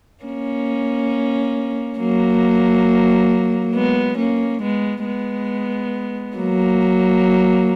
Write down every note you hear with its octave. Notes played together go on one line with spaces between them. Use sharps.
A#3 C#4
F#3 A#3
G#3 B3
A#3 C#4
G#3 B3
G#3 B3
F#3 A#3